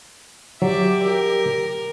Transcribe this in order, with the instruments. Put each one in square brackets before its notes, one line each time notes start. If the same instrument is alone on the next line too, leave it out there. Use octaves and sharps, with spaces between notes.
[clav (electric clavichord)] F#3 [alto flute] G4 [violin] D5 E5
[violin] A#4